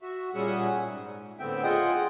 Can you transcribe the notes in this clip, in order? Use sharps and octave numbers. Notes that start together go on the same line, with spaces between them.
F#4 E5
A#2 G3 C#4 G#4 E5 F#5
G#2
A2 D3 B3 C4 E5 G5
F4 G#4 D#5 F#5 G5